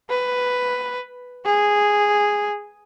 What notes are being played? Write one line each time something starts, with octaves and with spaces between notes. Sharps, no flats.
B4
G#4